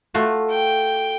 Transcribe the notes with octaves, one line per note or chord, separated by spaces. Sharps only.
A3 F4 F#4
G5